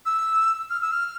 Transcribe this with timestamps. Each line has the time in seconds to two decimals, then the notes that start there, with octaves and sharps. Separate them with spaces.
0.06 E6
0.70 F6
0.81 E6
0.92 F6